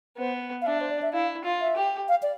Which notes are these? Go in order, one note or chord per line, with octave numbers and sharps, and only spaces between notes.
B3 C5
F5
D4 E5
C5
D5
E5
E4 F5
F4
E5
G4
F5
D5